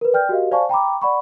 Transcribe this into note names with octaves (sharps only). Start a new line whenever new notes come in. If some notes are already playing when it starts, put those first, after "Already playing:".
A#4 B4
D5 G5 F6 G6
F#4 G4 A#4 D#5 F5
C5 D5 F5 G#5 A5 C#6
G5 A#5 B5 D6
D5 F#5 B5 C#6